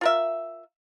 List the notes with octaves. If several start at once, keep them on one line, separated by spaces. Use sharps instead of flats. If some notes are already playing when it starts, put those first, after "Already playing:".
F4 A#4 E5